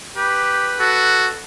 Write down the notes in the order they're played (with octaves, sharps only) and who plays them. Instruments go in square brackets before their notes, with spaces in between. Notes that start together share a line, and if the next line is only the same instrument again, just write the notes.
[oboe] G4 [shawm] B4
[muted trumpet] F#4 [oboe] A4